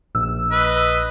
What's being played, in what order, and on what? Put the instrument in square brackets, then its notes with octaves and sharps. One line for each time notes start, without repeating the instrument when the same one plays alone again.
[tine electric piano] A#1 [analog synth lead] E6
[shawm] B4 [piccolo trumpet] D#5